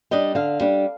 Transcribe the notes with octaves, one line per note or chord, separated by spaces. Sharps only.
G3 D4 D#5
D3 F5
G3 D4